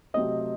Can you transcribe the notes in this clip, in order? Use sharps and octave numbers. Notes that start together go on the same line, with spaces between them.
C3 F#3 A3 C4 D#5